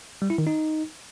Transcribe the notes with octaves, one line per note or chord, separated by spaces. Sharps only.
G3
E4
D#3
D#4